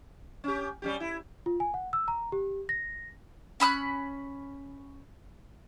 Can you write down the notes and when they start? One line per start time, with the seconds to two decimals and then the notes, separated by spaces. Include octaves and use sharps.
0.44 C#4 G4
0.82 G3 C#4 G4
1.00 E4
1.46 F4
1.60 G#5
1.74 F#5
1.93 E6
2.08 A#5
2.32 G4
2.69 A#6
3.60 C#4 B5 D#6 F#6